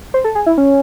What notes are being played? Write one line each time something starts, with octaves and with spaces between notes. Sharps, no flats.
C5
A4
G#4
E4
C#4